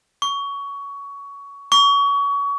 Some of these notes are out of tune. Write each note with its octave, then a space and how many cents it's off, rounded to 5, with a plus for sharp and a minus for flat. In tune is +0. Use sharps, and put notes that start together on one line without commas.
C#6 +20
C#6 +30